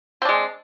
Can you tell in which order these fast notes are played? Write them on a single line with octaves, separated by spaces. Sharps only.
C4 D4 G#3